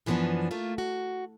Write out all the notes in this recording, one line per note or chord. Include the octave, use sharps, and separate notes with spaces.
F#2 E3 F3 G3 B3 D4
A3 A#3 F4
F#4